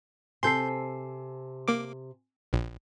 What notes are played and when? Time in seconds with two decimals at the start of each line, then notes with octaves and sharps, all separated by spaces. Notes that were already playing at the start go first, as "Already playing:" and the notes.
0.43 C3 C4 A4 G#5 C6 G6 C7
1.68 A#3 D6
2.53 A#1